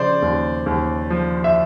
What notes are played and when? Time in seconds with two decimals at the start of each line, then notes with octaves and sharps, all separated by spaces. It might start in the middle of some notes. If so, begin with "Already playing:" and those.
Already playing: C#3 F3 C5 D5
0.22 D#2
0.66 D#2
1.10 F3
1.44 E5